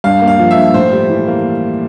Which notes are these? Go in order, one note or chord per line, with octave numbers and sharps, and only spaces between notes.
G2 F5
A#3
F5
F3
E5
G2
A2 C5
G3
E3
A#3